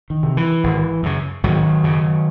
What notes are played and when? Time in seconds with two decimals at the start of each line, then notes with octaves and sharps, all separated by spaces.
0.10 D#3
0.23 C3
0.37 E3
0.64 G#1
1.03 F#2 C#3
1.43 G#1 D#3 F#3
1.83 F#2 C#3